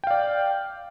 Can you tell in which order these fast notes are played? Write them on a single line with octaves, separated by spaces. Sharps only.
G5 F5 D5